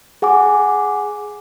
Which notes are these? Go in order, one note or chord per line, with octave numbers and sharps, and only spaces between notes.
G#4 F#5 G#5 D6